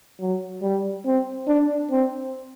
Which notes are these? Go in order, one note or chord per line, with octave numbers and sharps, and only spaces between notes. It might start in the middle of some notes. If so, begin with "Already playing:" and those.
F#3
G3
C4
D4
C4